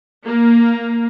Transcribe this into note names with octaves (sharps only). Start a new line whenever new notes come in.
A#3